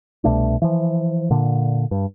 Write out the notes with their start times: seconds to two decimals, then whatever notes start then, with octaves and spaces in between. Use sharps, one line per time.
0.24 C2 B2 A3 D4
0.62 E3 F3
1.30 A#2 D3
1.91 G2